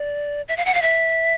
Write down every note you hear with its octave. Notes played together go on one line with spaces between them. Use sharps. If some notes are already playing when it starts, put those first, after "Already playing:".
Already playing: D5
E5
F5
F#5
F5
E5